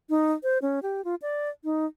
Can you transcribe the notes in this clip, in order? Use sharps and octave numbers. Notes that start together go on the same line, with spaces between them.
D#4
C5
C#4
G4
F4
D5
D#4